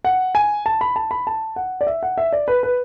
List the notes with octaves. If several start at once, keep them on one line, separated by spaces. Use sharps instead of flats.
F#5
G#5
A5
B5
A5
B5
A5
F#5
D5
E5
F#5
E5
D5
B4
B4